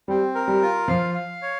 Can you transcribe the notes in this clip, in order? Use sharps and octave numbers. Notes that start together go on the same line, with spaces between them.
G3 C4
A#4
G3
F4
F3 F5
F5
C#5